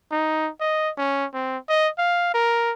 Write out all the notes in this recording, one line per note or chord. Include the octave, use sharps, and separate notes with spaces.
D#4
D#5
C#4
C4
D#5
F5
A#4